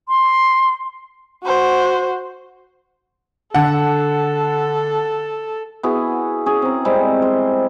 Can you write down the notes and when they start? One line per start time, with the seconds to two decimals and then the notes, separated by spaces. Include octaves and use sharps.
0.09 C6
1.44 F#4 C5
3.54 D3 A4 F#5 A5
5.83 B3 E4 F#4 G#4
6.46 C#4 G#4
6.62 C4 A#4
6.85 G3 G#3 C4
7.22 C5